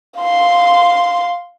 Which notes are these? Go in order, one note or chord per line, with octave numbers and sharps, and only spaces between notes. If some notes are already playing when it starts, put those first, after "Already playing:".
F5 C6